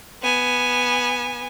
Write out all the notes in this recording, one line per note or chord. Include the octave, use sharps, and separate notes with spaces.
B3 G#5